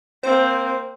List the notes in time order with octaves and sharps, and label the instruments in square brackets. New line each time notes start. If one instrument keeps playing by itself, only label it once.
[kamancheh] A#3 C4 [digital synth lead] C5